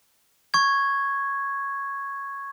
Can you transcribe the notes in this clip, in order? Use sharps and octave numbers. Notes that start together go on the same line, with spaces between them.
C#6 G#6